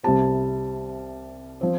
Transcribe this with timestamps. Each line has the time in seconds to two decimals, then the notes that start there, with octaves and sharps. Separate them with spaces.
0.04 C2 C3 G3 C4 A5
1.61 F3 C4